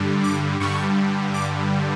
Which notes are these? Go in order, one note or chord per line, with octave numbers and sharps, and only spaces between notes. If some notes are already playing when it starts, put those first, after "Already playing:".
Already playing: G2 D3 G3
D6
G2 D3 G3 C#6
D6